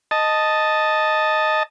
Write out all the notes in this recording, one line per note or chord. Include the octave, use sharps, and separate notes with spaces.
D#5 A5